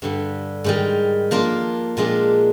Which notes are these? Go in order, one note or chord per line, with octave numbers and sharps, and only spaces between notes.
G2 D3 G3
G#2 D#3 G3
F3 A#3 D4 F4
A#2 F3 G#3 D4 G4